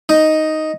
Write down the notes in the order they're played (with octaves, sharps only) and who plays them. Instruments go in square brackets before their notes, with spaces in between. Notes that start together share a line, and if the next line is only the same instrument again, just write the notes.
[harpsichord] D#4